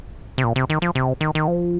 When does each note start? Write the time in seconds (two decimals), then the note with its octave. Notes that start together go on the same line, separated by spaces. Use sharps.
0.38 C3
0.44 A#2
0.56 C3
0.70 D#3
0.82 F3
0.95 C3
1.21 D#3
1.35 D#3
1.48 F3